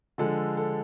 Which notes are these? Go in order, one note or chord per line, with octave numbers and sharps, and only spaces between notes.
D3 F3 G#3 A4
A4